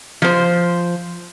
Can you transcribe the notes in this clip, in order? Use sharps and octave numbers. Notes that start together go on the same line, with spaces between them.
F3 C5